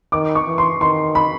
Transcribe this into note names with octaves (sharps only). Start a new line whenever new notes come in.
D#3 D6
C#6
E3
C6
D#3 C6
B5